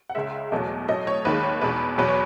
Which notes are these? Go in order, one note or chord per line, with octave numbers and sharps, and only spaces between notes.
F#5
C#2 C#3 G#3 E5
E2 B2 F#3 A3 D#5
A2 F#3 A3 D#5
C#5
D#2 D#3 G#3 B4
C#5
E2 B2 G#3 B4
E2 B2 F#3 B4
C#5